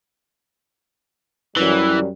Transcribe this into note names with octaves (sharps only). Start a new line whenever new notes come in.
F#2 E3 G3